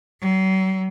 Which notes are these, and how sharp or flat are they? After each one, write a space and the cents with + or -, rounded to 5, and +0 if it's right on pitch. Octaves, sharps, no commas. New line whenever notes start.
F#3 +40